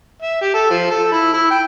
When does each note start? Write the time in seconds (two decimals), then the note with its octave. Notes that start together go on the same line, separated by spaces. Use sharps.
0.22 E5
0.42 G4
0.54 A4
0.70 F3
0.90 A4
1.12 E4
1.34 E4
1.51 G5